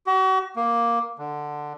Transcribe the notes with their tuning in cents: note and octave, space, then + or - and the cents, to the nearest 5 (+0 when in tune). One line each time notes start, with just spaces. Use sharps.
F#4 +40
A#3 +5
D3 +10